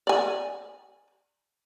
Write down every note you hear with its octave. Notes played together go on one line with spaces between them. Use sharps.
D5 G#5